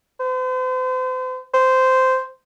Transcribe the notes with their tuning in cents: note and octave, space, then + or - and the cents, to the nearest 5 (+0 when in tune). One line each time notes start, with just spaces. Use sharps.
C5 -40
C5 -10